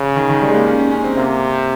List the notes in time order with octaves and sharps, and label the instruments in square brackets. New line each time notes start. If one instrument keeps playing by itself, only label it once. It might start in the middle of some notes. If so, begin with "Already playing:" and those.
Already playing: [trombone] C#3
[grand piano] D#3
D#3
G3
G#3
A#3
C#4
C#4
C#4
C4
[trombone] C3 [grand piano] A#3